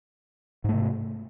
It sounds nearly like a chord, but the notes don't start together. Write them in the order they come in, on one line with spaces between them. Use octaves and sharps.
G#2 A3 C3